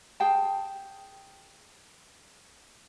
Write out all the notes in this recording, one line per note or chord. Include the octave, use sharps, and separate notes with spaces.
G#4 G5 A5